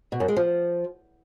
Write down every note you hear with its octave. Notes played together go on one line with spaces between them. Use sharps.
B2
F#2
G#3
F3